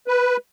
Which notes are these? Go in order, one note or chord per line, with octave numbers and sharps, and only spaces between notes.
B4